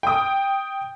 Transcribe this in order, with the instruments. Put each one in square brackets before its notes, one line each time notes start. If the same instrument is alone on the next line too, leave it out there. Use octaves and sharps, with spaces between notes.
[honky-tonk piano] G5 D#6